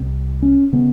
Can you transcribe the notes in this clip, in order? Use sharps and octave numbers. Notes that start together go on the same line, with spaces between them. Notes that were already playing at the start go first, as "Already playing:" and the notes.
Already playing: C2 C3
C#4
C#3 B3